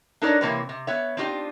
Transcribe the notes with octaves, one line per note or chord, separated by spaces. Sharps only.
D4 D#4 A4 A#4 C#5 D5
C3 E3 A#3 C4 A#4 C#5
C3
B3 C#5 E5
C4 D4 D#4 F4 G4